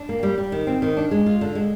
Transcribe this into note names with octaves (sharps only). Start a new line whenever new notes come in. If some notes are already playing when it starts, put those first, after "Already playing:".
Already playing: D4
A#3
G3
G3
D#3
C4
D#3
D4
G#3
F4
D3
G#3